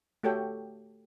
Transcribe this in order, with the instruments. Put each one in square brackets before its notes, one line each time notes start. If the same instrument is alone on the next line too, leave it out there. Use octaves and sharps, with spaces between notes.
[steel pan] A3 F#4 G4 A4 C#5 G5